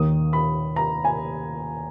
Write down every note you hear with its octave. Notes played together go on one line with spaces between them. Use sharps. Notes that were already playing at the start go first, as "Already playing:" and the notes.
Already playing: D#2 D#3 D#6
B5
A#5
G#5